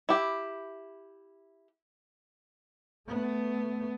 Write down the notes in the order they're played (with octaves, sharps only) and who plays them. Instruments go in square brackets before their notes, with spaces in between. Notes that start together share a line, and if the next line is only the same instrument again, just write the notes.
[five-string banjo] E4 G4
[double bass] A3 B3